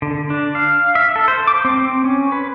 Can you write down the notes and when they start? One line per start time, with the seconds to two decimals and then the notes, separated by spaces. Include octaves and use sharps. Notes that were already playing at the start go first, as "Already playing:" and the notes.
0.02 D3
0.30 D4
0.55 F5
0.95 E5
1.16 A4
1.28 C5
1.47 D6
1.65 C4
1.80 C4
2.04 C#4
2.32 B4